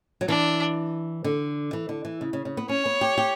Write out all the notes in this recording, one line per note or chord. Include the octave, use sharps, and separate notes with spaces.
F#3
E3 D4
D3
E3
D3
E3
C#3
C#3
C#3
B3
C#4 C#5
B3
G4
G4